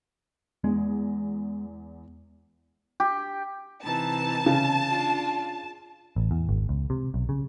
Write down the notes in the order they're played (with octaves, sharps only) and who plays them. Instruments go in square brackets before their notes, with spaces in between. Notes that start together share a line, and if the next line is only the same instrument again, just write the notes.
[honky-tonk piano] E2 [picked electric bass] G#3
[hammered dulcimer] G4
[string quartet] C3 E3 D#4 [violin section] A5
[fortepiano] C#3
[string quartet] D4 F4
[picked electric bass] A1
E2
G#1
C#2
C3
B1
C#3